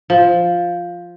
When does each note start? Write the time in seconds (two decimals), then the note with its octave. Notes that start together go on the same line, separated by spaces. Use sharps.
0.10 F3